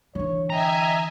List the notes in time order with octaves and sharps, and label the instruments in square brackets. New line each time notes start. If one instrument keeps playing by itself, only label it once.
[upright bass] D3 E3 [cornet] C#5
[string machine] D#5 E5 G#5 [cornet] G5 [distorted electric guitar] A#5